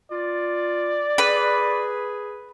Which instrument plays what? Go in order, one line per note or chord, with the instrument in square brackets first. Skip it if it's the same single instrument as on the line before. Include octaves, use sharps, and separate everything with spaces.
[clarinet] F4 [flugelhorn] D5
[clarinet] G#4 [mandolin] B4